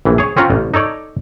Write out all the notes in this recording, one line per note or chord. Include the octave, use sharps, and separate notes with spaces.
A#1 E3
G#4 C#5
C4 C#4 F4 F#5 A#5
A1
D#4 A4 C#5 D5